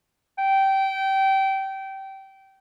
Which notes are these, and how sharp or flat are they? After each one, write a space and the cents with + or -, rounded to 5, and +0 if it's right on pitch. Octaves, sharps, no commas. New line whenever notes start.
G5 -20